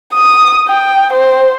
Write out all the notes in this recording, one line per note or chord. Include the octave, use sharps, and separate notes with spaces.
D#6
G5
C5